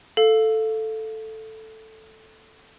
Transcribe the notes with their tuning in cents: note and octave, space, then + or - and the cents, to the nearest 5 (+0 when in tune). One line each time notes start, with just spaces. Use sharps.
A4 +0 F5 +0